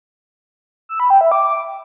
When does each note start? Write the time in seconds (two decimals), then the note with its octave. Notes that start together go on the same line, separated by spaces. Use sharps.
0.89 E6
1.00 B5
1.10 G5
1.21 E5
1.32 D6